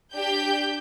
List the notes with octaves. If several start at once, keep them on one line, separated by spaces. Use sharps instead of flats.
D4 G4 G6